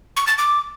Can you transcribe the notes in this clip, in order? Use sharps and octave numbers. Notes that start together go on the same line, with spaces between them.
C#6
A6
D6